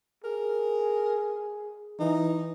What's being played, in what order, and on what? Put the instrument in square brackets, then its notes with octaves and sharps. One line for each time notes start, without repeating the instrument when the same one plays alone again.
[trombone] G#4 [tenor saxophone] A#4
[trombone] E3 [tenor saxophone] D#4